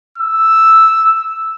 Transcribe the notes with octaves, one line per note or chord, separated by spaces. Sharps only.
E6